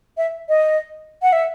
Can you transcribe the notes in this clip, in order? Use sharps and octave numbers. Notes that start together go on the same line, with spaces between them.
E5
D#5
F#5
E5